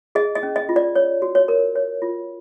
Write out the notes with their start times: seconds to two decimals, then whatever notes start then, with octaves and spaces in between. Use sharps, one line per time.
0.15 G#4 D#5
0.35 D#5
0.43 C#4
0.56 D#5
0.69 F4
0.76 D5
0.95 C#5
1.22 F#4
1.35 C#5
1.48 A#4
1.75 C#5
2.02 F4